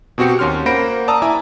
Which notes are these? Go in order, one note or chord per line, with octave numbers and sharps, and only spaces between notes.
B2 C4 F#4 G4 C#7
D#2 C#4 C6 F6
A#3 C5 F#5 B5 A#6 D7
D5 A5 A#5 D#6 E6
E4 E5 G#5 A#5 D6